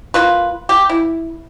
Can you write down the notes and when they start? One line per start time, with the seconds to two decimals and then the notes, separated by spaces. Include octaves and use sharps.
0.14 A#3 F4 B4
0.69 G4
0.90 E4